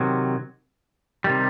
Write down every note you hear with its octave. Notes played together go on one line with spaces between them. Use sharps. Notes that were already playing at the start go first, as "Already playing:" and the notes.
Already playing: C3 D#3 F#3
C3 D#3 G3